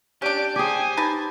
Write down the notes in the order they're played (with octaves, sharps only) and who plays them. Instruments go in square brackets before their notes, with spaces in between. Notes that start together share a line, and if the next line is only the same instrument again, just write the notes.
[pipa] C#4 D4 [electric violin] G4 D7 [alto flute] D5
[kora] G4 G#4 [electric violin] C5 G#5 [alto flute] G5
[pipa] D#4 B4 A5 [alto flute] B5